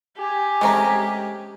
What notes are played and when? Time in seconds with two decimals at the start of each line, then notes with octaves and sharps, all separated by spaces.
0.17 G4 G#5
0.61 G#3 A3 C4 C#4 A#5